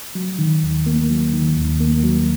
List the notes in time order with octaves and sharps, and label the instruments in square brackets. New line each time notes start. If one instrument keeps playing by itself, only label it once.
[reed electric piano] F#3
D#3
D#2
A#3
F#3
D#3
D#2
A#3
F#3